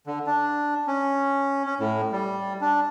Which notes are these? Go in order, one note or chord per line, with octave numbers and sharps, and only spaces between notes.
D3
D4
C#4
C#4
A2
G3
D4